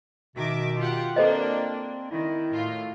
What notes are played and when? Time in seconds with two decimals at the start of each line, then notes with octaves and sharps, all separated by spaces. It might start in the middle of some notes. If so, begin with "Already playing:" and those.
0.36 B2 D#3 E5 D6
0.78 F4 G4 F#5
1.16 A#3 C4 D4 A4 C5 D#5
2.11 D#3 E4
2.51 A2 F4